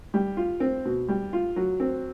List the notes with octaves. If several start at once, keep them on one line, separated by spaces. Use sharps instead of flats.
G3
F4
C4
B2
G3
F4
F#3
C4